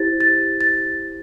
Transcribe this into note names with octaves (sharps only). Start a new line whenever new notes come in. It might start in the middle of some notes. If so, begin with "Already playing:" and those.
Already playing: E4 G4 C5 A6
A6
A6